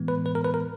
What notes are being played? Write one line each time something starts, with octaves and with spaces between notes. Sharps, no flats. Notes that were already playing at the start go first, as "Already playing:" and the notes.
Already playing: A2 E3 G#3 B3
B4
B4
A#4
B4
A#4